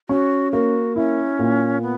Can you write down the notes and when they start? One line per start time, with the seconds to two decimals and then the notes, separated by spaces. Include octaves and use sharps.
0.09 C#4 F#4
0.52 A#3 F#4
0.96 C#4 E4
1.39 A#2
1.82 B3